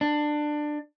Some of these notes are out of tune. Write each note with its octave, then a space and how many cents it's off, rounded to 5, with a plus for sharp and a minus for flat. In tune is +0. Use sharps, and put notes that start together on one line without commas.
D4 +20